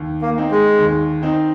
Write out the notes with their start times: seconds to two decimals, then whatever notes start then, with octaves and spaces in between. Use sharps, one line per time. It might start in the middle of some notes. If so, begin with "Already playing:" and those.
Already playing: D#2
0.21 A#3
0.37 D#3 C4 D#4
0.51 G#3
0.79 D#2
1.22 D#3 C4 D#4